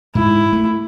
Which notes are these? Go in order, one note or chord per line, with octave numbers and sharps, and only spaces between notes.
G#2 E4
A3